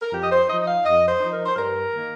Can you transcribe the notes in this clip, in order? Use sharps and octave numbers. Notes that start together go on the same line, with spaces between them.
A#4
F2 G4
D#5
C5
F3 D#4 D#5
D#5
F5
F2 D#5
C5
F3 D#4
A#4
C5
G2 A#4
D#3 A#3